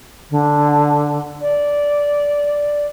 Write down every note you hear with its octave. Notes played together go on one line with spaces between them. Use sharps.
D3
D5